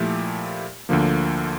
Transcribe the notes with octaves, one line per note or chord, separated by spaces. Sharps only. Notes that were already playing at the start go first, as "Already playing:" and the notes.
Already playing: A#2 F3 A3 E4 G4
D2 D3 F3 A#3